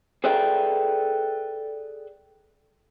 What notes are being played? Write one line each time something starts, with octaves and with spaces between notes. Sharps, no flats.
G#4 A4 B4 D5 E5 G5